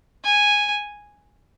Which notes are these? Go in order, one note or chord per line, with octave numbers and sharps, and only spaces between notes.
G#5